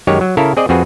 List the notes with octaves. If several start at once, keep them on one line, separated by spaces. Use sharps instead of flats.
F#2 D#3 G#3 G4 C#5
F#3
C#3 E4 A4 A#4 F5
C4 G#4 D5 D#5
F2 C4 F#4 G#4 B4